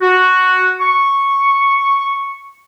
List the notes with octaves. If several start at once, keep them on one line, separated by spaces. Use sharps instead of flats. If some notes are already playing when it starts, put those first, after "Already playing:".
F#4
C#6